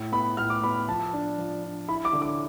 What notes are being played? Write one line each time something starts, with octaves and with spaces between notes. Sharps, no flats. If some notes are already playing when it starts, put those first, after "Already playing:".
Already playing: A2
B3 B5
A2 F6
D6
B3 B5
F3 A5
D4
F3
D4
E4 B5
D6
D3
D6